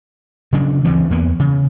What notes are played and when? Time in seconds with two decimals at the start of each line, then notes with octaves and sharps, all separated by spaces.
0.53 C#3 F#3 D4
0.85 D2 E3 C4
1.11 E2 A#3 B3
1.39 C#3